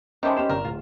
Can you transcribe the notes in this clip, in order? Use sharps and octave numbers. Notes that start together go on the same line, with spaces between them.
D#3 G3 G#3 C#4 C5 E5 A5
C#4 G4 C5 E7
G1 A#4 D5 A#5
D1 F4